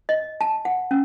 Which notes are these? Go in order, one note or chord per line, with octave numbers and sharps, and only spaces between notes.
D#5
A5
F#5
C#4